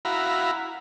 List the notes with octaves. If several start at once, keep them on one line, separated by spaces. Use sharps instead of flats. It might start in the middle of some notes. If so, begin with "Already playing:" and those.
E4 F#4 F5 A#5 B5